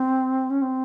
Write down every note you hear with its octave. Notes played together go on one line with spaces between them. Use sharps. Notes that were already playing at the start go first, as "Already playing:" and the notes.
Already playing: C4
C#4
C4